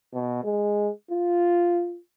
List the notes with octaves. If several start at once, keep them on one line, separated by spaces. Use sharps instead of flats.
B2
G#3
F4